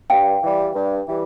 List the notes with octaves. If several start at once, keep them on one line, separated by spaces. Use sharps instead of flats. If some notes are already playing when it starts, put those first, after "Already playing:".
G2 F5 G5
E3 G3
G2
E3 G3